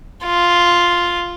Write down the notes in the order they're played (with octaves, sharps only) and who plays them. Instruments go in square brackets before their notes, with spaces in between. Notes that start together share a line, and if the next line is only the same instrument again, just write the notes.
[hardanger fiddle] F4